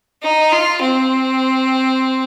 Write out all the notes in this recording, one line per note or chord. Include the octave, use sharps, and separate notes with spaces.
D#4
F4
C4